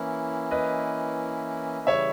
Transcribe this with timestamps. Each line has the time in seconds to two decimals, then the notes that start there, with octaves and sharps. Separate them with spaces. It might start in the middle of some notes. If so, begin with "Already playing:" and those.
Already playing: E3 A#3 C#4 E4
0.51 B4 D#5
1.87 C#3 E3 G3 C#5 E5